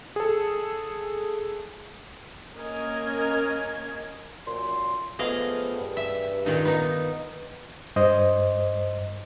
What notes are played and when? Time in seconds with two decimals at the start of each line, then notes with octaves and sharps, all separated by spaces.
0.16 G#4 A4
2.57 A#3 C#4 A#4 D#5 G#5
4.46 F#2 A#2 C6
5.19 F3 A3 B3 G#4 D#5 F5
5.79 G2
5.97 E5
6.46 A#2 D#3 D#4
6.65 B3 D#4
7.96 G2 C5 D#5